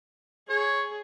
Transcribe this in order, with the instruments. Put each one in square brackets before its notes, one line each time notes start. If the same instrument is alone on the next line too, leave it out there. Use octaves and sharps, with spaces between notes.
[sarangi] G#4 [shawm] C#5